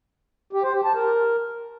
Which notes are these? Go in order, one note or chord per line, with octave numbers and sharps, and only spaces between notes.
G4
C5
G4
A5
A#4